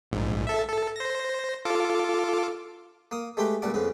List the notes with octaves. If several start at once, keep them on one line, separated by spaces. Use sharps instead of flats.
A#1 G#2
A4 E5
A4
C5 A#6
F4 A4 D6
A#3 D#6
G#3 A3 G4 B4 G5
C#2 A#2 G3 F#5 D6
F2 C#3 B3